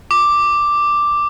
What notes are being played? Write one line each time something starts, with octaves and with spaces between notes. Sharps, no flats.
D6